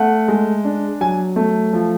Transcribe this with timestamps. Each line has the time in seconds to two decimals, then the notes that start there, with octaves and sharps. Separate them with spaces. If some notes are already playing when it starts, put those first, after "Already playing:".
Already playing: A3 F#5
0.28 G#3
0.64 D4
1.01 F#3 G#5
1.36 A3
1.73 F3